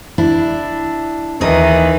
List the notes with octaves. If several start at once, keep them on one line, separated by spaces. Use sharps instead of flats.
D4 E4
D#2 D#3 E3 D#4 D#5